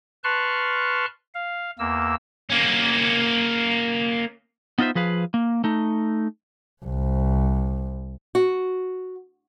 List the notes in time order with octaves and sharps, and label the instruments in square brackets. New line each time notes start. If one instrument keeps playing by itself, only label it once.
[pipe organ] B4 A5 C6 C#6 F6 F#6
F5
E2 A#3 E6
[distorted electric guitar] A#3 C#4
[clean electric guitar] B3 D#4 F4 A4 C5 E5
F3 G#4 B4 F5
A#3
A3 D#4
[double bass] C2
[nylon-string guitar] F#4